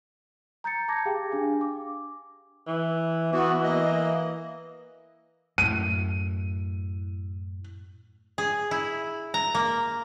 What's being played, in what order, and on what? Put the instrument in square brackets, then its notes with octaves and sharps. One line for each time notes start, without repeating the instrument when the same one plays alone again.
[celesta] A#5 G6 A6 C#7
A5 A#5 D6 G#6 A#6
G4 G#4 F5 G5
D4 F5 G#5
D6
[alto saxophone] E3
[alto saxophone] E3 [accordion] B3 F#4
[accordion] A#3 D#5
[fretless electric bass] F#2 A2 [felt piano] D#7
[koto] G#4
E4
A#5
A#3